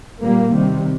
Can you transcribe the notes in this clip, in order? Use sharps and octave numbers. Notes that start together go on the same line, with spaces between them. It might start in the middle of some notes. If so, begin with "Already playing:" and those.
A#2 G3 A#3
C3 D#3 G3